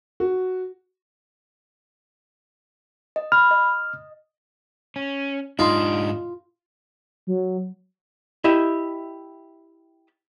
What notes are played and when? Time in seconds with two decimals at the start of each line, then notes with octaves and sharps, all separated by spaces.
0.20 F#4
3.16 D#5
3.32 B5 F6
3.51 D#5
4.96 C#4
5.59 G#2 D4 D#4 F4 C6
7.27 F#3
8.44 E4 G4 D#5 E5